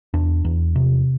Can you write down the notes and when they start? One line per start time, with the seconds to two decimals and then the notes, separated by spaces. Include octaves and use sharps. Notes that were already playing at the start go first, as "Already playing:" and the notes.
0.14 E2 D4
0.45 E2
0.76 C3